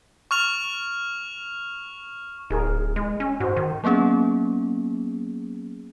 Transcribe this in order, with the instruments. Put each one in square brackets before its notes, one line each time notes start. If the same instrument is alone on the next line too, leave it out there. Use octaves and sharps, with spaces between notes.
[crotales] C#6 F6 F7
[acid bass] D1 [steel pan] D#4 G#4 A#4
[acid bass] G#3
C#4
[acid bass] G#2 [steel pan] F#4 C5
[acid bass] D#3
[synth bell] F#3 A#3 B3 C#4 G#4